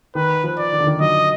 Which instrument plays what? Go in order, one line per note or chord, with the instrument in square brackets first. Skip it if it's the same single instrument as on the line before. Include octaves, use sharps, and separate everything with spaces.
[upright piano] D#3 [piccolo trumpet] B4
[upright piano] F3
[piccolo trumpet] D5
[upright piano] D#3
D3
D#3
[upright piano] F#3 [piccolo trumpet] D#5